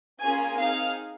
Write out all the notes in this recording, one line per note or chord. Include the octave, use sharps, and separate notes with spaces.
A#3 C#4 F4 G#4 G#5
C4 D#4 G#4 F5